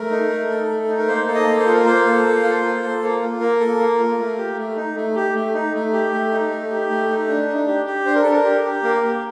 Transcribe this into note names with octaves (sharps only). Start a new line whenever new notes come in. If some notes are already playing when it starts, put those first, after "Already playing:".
Already playing: A3 A#4
D#4
A3
A4
A3
D#4
A#4
A#3 C5
A4
D#5
A#3
C5
F4
A#4
A#3 C5
A4
A#3
F4
A#3
A4
A#3
F4
A#3 A#4
A4
A#3
F4
A3
G4
A3
D#4
A3
G4
A3
D#4
A3
G4
A3
D#4
A3
G4
A3
D#4
D4
D4
G4
G4
D4 C5
A#4
D4 A4
A#4
G4
G4
A#3 A#4
G4